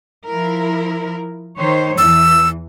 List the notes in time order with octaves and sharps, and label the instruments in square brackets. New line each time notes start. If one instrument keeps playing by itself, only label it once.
[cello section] F3 E4 A#4
D#3 C5 C#5
[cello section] E2 E3 [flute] E6